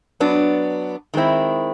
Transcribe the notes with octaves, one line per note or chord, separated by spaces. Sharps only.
F#3 B3 D4
D#3 G#3 C4 E4